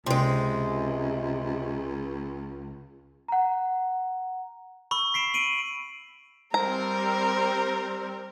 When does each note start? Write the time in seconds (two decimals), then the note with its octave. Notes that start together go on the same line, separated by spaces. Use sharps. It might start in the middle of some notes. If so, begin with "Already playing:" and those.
0.06 C#2 C3 G#3
3.28 F#5 A#5
4.91 B5 C#6 E6
5.14 B6 C7 D7 E7
5.34 D7 D#7 F#7
6.54 G3 C4 A#4 C5 A#5